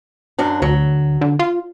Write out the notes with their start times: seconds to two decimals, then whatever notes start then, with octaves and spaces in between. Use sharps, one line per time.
0.39 F#2 F#3 D4
0.62 D2 F#3
1.21 D3
1.39 F4